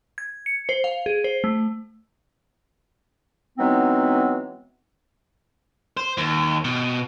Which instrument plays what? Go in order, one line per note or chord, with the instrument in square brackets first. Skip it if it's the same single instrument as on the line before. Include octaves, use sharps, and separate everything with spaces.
[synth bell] G#6
C#7
C5
F5
G#4
C5
A3
[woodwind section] E3 F#3 G#3 B3 C4 D#4
[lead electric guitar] C5
D#2
B2